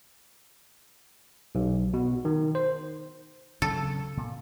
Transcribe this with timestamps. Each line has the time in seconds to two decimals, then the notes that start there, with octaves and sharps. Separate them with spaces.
1.55 B1
1.94 B2
2.25 D#3
2.55 C5
3.62 C#3 F#3 C4 A4
4.17 A#2